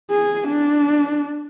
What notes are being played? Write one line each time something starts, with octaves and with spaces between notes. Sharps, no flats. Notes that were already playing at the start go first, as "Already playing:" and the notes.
G#4
D4